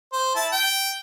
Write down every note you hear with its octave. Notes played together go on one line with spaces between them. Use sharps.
C5
E4 A5
G5